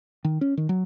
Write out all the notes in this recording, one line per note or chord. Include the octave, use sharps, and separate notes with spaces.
D#3
C#4
D#3
F#3